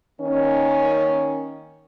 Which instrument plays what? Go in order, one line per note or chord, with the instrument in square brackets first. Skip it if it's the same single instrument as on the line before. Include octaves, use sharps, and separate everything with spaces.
[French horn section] D#3 A#3 C#4